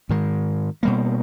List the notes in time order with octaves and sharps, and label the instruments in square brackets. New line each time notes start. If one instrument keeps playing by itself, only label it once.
[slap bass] G#2 D#3 G#3
B2 G3 A#3